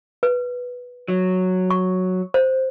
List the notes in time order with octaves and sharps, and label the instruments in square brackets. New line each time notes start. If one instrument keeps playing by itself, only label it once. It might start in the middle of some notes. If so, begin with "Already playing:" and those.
[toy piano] B4
[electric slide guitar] F#3
[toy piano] C#6
C5